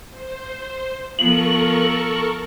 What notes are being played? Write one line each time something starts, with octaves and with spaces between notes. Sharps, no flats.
C5
F3 B3 A4 A#4 C#6 F#7